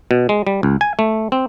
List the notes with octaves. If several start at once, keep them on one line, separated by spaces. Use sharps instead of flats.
B2
G#3
G3
C#2
G#5
A3
C4